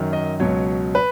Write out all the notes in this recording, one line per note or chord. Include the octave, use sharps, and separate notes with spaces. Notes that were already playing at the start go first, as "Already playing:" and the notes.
Already playing: F#2 D#3 F#3
D#5
C#2 B2 F#3 C#5
B4